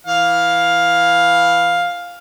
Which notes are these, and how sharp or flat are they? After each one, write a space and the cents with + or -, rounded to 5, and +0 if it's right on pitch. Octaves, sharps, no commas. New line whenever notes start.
E3 +0 F5 +10